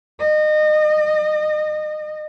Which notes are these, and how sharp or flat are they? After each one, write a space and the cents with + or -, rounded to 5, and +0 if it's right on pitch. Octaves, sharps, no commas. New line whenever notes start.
D#5 -30